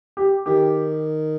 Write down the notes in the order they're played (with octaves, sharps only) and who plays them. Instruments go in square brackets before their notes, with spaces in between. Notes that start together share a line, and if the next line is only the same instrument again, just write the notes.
[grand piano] G4
[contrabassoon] D#3 [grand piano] G4